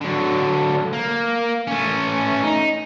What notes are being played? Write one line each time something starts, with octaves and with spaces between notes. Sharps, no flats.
D3 F#3
A#3
A3 C#4
D#4